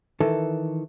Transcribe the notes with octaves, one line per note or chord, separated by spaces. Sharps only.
D#3 E3 A4